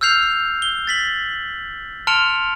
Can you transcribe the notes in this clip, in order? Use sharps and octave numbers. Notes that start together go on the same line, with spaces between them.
E6 F6 G6 C7 F7
G7
G6 A6 B6 F#7
A5 C6 F6 C#7 D7 F7